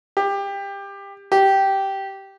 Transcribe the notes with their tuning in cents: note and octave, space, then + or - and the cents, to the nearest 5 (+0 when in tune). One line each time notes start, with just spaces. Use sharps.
G4 +20
G4 -10